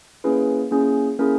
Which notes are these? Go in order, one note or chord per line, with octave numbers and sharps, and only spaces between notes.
A#3 C#4 E4 G#4 B4
A#3 C#4 E4 G#4
A#3 C#4 E4 G#4 A#4